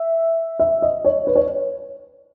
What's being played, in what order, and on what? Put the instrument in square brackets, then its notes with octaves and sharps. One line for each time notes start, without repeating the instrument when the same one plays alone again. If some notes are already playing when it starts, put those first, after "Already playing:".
Already playing: [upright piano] E5
E5
D#5
C#5
B4
C#5